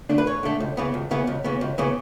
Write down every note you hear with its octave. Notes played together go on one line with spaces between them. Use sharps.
D3 A3 D4
B4
E2 C#5
D3 A3 D4
C#2
C#3 E3 B3
C#2
C#3 E3 B3
C#2
C#3 E3 B3
C#2
C#3 E3 B3